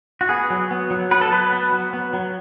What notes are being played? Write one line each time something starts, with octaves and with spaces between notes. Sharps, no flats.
F#4
B3 G#4
F#3
B3
F#3
B3 B4
A4
F#3 B4
B3
F#3
B3
F#3